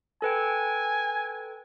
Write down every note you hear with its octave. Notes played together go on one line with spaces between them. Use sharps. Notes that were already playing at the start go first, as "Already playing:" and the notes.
A4 B4 G5 G#5